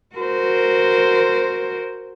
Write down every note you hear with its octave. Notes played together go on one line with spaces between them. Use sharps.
F#4 A#4 C5